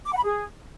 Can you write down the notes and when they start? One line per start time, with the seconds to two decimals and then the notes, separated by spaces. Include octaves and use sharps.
0.05 D6
0.12 F#5
0.18 B5
0.24 G#4